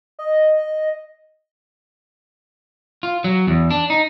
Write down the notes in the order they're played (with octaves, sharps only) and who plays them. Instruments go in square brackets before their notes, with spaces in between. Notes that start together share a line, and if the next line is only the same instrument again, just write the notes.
[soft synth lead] D#5
[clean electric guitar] F4
F#3
E2
D4
D#4